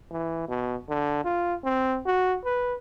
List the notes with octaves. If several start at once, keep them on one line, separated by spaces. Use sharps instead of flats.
E3
B2
D3
F4
C4
F#4
B4